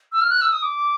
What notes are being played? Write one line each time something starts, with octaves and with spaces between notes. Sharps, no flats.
E6
F6
F#6
E6
D#6
D6